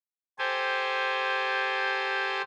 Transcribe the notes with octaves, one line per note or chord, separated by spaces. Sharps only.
G4 A4 C5 G#5